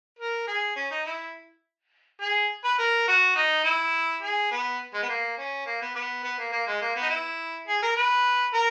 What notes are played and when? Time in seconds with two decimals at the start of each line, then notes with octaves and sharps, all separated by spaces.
0.19 A#4
0.48 G#4
0.76 C#4
0.91 D#4
1.06 E4
2.21 G#4
2.64 B4
2.79 A#4
3.07 F#4
3.35 D#4
3.64 E4
4.23 G#4
4.51 B3
4.94 G#3
5.02 B3
5.09 A#3
5.38 C#4
5.66 A#3
5.81 B3
5.95 B3
6.23 B3
6.38 A#3
6.52 A#3
6.67 G#3
6.81 A#3
6.96 B3
7.02 D#4
7.10 E4
7.68 G#4
7.83 A#4
7.97 B4
8.54 A#4